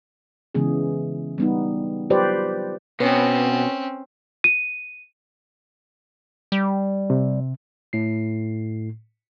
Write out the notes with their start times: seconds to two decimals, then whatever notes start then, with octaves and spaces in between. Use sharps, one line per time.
0.55 C#3 E3 G#3 B3 G#4
1.38 G3 B3 D#4
2.10 F#3 F4 G4 B4 C5 D5
3.00 B2 C4 C#4 B4 C#5 G#5
4.44 D#7
6.52 G3
7.10 C3
7.93 A2 C7